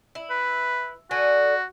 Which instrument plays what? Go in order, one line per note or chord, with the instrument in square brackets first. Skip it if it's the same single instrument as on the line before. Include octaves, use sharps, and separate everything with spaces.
[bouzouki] E4
[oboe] B4
[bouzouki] D3 G#5 [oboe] F#4